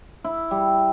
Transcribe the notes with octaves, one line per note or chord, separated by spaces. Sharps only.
E4
G3